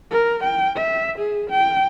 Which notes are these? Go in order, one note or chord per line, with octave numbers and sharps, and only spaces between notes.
A#4
G5
E5
G#4
G5